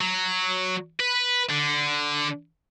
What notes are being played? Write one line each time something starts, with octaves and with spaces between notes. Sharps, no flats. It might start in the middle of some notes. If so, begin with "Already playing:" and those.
F#3
B4
D3